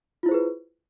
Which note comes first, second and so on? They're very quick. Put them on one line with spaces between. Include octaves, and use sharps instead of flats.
F4 E4 C5 G#4 B4